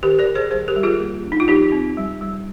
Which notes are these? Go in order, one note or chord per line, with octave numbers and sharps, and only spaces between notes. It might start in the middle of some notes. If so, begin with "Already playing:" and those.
D#3 G4 A#4
A#4 D5
D#3
G#4 C5
G3 G#4 C5
G4 A#4
G3
F4 G#4
A#3
D4
D#4
F4
F3 D#4 G4
C4
G3
G3